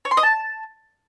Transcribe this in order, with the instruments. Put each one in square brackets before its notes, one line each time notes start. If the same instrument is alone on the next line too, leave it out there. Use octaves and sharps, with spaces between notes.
[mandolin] C#5
C6
D#5
A5